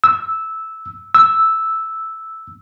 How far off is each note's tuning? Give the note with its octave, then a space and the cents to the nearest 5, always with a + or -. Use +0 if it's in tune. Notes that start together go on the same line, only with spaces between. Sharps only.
E6 -10
E6 -5